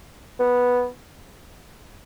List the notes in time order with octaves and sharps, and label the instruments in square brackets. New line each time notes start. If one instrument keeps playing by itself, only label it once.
[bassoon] B3